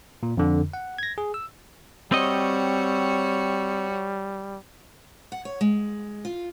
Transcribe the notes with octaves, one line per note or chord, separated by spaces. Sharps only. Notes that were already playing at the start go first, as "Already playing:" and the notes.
A#2
F2 D3
F#5
G#6 A#6
G#4
E6
G3 C4 F#4 C#5 D#5
F#5
C#5
G#3
F4